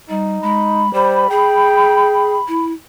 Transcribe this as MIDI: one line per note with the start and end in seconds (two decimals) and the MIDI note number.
0.10 0.38 55
0.10 0.86 63
0.43 0.90 56
0.43 2.67 83
0.94 1.25 55
0.94 1.26 72
1.30 2.36 68
1.30 2.42 79
2.48 2.72 64